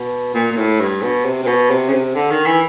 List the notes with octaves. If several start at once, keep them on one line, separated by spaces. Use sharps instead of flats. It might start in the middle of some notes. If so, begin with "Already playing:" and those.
Already playing: B2
A#2
A#2
A2
G2
B2
C3
C3
B2
C3
C#3
C3
D3
D#3
E3